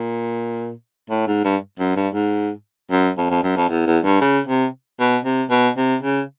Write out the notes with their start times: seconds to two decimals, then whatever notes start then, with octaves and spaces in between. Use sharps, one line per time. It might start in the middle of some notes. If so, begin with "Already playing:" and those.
Already playing: A#2
1.10 A2
1.27 G#2
1.44 G2
1.79 F#2
1.96 G2
2.14 G#2
2.91 F#2
3.18 F2
3.30 F2
3.43 F#2
3.57 F2
3.70 E2
3.87 E2
4.04 G2
4.21 C#3
4.47 C3
4.99 B2
5.25 C3
5.51 B2
5.77 C3
6.03 C#3